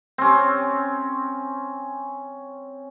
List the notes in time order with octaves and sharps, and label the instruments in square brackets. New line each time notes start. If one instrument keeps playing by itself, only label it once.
[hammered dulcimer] C4 C#4